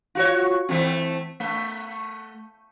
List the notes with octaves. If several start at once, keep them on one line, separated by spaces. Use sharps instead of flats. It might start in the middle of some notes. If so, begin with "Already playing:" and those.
F4 F#4 C#5
E3 A3 C4
A3